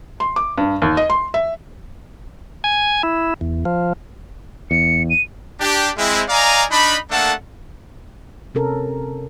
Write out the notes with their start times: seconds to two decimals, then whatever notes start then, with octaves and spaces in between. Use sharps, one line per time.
0.20 C6
0.36 D6
0.58 G2
0.82 D#2
0.97 D#5
1.10 C6
1.34 E5
2.64 G#5
3.03 E4
3.41 E2
3.65 F3
4.71 E2 C#7
5.10 D#7
5.60 D4 G4
5.97 G#3 C4 E4
6.29 D5 D#5 F5 G#5 A#5
6.70 D4 D#4 B5
7.10 A3 A#3 D4 A4 F#5 A5
8.55 C3 C#4 A4 A#4